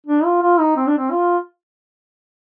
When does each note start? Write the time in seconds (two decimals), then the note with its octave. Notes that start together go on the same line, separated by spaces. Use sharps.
0.07 D4
0.25 F4
0.42 F4
0.59 D#4
0.76 C4
0.87 D4
0.97 C4
1.11 F4